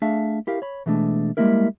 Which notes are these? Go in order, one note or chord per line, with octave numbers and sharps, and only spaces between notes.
A3 D4 G#4 E5 F5 A5
E4 G4 A#4 F5
C#5 B5
B2 E3 G#3 A3 D4
G3 G#3 A#3 D#4 E4 A#4